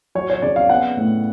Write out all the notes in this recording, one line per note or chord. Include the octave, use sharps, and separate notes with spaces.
F#3 C#5
C#5
C#3 D5
F5
B3 F#5
A2